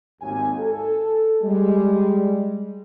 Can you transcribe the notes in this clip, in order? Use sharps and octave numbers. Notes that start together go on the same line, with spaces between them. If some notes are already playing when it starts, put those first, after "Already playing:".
G#1 D#2 G#5
A4
G3 G#3